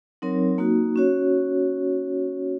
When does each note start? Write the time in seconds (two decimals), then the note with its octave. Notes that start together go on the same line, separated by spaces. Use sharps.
0.22 F#3 C4 D#4 A#4 C#5
0.58 A#3 D#4 F#4
0.96 C#4 F#4 C#5